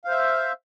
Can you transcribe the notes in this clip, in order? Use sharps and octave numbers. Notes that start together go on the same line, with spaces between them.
C5 E5 F5